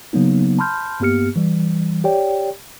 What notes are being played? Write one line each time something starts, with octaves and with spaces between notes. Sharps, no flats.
C#3 F#3 A#3 B3 D#4
A5 B5 C6 F6 G6
G2 A#3 B3 G4 F6 C#7
E3 G3
G4 C#5 D5 G5